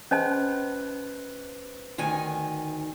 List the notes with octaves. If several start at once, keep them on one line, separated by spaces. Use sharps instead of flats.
C#4 B4 C5 D#5 A5 F#6
D2 D#3 G#5